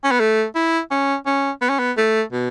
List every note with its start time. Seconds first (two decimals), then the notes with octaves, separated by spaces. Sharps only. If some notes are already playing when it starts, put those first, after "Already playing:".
0.04 C#4
0.11 B3
0.20 A3
0.55 E4
0.91 C#4
1.26 C#4
1.62 B3
1.70 C#4
1.79 B3
1.97 A3
2.33 B2